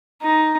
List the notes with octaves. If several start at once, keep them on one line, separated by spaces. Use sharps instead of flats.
D#4